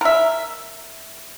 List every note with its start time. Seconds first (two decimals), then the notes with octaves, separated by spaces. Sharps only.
0.01 A#4 E5